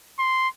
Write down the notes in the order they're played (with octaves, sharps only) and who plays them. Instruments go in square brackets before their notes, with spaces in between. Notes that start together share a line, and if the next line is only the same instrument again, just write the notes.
[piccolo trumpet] C6